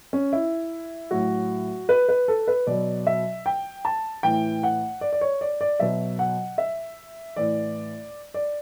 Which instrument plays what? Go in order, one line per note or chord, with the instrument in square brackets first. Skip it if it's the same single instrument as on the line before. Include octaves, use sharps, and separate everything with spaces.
[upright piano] C#4
E4
A2 F#3 F#4
B4
B4
A4
B4
B2 F#3 D5
E5
G5
A5
A2 E3 G5
F#5
D5
D5
C#5
D5
D5
B2 F#3 E5
F#5
E5
A2 E3 D5
D5